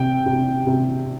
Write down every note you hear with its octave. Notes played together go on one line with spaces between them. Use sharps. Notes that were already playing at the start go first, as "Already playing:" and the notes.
Already playing: C3 G5
C3
C3